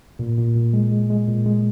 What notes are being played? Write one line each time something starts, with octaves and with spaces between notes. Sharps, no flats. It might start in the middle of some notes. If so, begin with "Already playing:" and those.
A#2
A#2
A#2
G#3
G#3
G#3
A#2
G#3